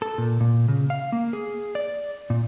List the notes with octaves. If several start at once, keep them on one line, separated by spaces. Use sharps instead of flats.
A4
A#2
A#2
C#3
F5
A#3
G#4
D5
A#2